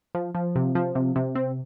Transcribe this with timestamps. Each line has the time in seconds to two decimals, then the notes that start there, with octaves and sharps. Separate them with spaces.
0.15 F3
0.35 F3
0.56 C3
0.75 F3
0.95 C3
1.16 C3
1.35 C4